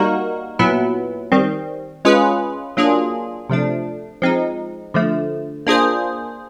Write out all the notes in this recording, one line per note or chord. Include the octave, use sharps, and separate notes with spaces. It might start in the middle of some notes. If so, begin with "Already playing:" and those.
Already playing: G3 A#3 D#4 F#4 A#4
A#2 F#3 B3 E4
D#3 G3 C4
G#3 C#4 F4 G#4 B4
F#3 A#3 D4 F4 G#4
C3 F3 A3 D4
F3 G#3 C4 D#4
D3 F3 A3
A#3 D4 F4 G#4 C5